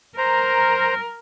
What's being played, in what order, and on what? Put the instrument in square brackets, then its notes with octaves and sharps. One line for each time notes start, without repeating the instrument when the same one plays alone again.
[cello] A#4 [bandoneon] C5 A#5